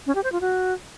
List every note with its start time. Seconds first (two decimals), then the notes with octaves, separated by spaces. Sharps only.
0.07 C#4
0.15 G4
0.24 C5
0.32 F4
0.41 F#4